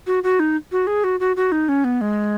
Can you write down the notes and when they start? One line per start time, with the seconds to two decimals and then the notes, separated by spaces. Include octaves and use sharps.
0.07 F#4
0.23 F#4
0.39 D#4
0.72 F#4
0.87 G#4
1.04 F#4
1.20 F#4
1.36 F#4
1.52 D#4
1.68 C#4
1.84 B3
2.01 G#3